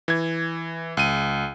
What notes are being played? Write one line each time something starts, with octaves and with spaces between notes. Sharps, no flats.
E3 G#6
C#2 D#7